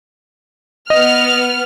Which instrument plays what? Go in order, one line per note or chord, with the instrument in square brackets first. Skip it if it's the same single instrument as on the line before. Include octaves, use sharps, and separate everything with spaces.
[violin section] B3 F6 [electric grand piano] D#5